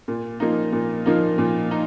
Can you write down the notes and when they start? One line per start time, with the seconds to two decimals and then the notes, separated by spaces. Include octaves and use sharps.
0.08 A#2
0.40 F3 A#3 D#4
0.73 A#2
1.06 F3 A#3 D#4
1.38 A#2
1.71 D#4